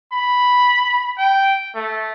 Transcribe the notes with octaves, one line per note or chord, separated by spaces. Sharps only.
B5
G5
A3